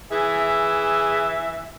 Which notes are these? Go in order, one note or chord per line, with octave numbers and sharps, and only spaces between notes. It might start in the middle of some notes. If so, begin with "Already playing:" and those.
E3 G#4 E5